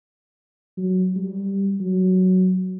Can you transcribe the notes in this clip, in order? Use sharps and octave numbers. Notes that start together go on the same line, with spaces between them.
F#3
G3
F#3